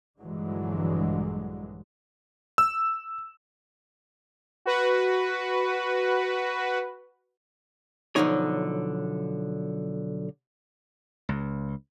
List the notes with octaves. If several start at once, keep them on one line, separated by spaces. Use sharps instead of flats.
A#1 G2 D3 E3 F#3 G#3
E6
F#4 B4
B1 G2 D3 F3 D#4 C#5
C#2